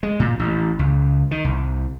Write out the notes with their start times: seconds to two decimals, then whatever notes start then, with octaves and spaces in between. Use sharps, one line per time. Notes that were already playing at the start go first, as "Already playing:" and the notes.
0.03 G#3
0.20 A#2
0.39 A1
0.79 C#2
1.31 D#3
1.44 C2